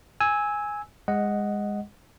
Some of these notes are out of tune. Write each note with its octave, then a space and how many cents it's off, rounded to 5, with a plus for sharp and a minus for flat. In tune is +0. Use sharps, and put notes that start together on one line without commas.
G#5 +0 E6 -20
G#3 -20 D#5 +0 F#5 +0